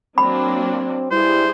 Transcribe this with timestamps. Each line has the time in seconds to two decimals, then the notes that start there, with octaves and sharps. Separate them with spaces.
0.18 F#3 A#3 C4 D4 B5
1.11 G2 G3 E4 G#4 C5